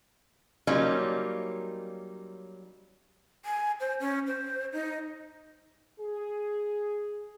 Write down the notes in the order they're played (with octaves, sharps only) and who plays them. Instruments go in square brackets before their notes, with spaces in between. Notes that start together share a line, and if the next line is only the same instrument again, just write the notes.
[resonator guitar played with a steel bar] F#3 G3 A#3 C#4 D#4 F4
[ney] G#5
C5
C#4
C5
D#4
[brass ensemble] G#4